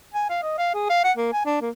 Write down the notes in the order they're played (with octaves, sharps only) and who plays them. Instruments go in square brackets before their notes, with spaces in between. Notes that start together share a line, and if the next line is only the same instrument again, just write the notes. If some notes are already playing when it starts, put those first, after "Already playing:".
[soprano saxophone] G#5
F5
D#5
F5
G#4
F5
F#5
A#3
G#5
D4
A#3